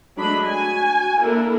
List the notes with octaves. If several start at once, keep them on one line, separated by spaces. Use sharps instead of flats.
F#3 G#3 A3 D4 D#5 B5
F#4 G#5
A#3 D4 E4 A4 A#4